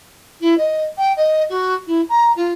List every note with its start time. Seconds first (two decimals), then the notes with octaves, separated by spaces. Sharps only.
0.40 E4
0.57 D#5
0.97 G5
1.16 D#5
1.49 F#4
1.87 E4
2.09 A#5
2.36 F4